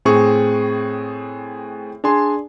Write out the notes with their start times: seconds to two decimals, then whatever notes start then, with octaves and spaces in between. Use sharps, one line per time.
0.05 A2 C4 G#4 C#6
2.04 D4 G#4 G#5 C6